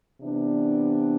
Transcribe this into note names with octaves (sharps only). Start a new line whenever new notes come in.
C3 E3 B3 D4